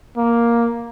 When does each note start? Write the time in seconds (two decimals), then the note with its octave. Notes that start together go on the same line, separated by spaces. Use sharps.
0.17 A#3